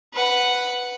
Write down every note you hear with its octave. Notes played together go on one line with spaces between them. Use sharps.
B4 F#5